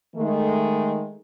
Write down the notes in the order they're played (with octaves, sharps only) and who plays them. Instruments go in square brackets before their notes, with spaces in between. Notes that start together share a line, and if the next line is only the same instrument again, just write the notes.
[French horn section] D#3 G#3 A3